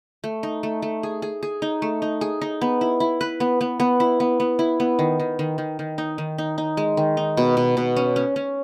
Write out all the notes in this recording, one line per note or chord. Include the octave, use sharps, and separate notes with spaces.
A3
D#4
A3
A3
G#4
G#4
G#4
D#4
A3
D#4
G#4
D#4
B3
E4
E4
B4
B3
B3
B3
E4
B3
B3
E4
B3
D#3
D#3
D#3
D#3
D#3
D#4
D#3
D#4
D#4
G#3
D#3
D#4
B2
B2
B2
C#4
C#4
C#4